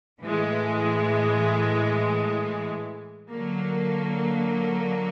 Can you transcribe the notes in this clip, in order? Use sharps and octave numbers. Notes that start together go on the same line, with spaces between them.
A2 E3 G#3
D3 F#3 A#3